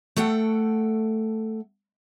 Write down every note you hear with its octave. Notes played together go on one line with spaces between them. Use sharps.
A3 A4 F#5 G5